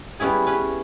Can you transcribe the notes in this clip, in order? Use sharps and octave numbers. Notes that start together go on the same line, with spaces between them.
G3 B3 C#4 E4 G#4
C#4 B4